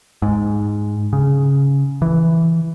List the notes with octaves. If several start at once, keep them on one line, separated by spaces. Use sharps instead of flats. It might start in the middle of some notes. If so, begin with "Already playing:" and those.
G#2
C#3
E3